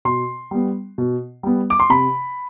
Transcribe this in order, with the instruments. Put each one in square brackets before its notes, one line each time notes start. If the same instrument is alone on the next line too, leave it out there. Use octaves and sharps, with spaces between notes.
[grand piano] B2 C6
G3 B3
B2
G3 B3
D6
C6
C3 B5